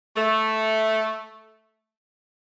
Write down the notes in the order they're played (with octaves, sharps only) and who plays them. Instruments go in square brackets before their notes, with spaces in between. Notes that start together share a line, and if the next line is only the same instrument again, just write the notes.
[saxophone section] A3